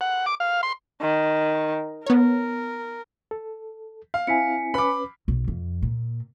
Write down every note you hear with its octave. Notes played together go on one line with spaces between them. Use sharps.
F#5
D6
F5
C6
D#3
B3 A#4 C#5
A4
F5
C4 E4 G#5 B6 C#7
C#4 B4 B5 D6
B1
F2
A#2